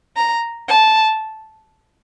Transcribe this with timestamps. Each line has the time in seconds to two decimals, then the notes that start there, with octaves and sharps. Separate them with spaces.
0.16 A#5
0.69 A5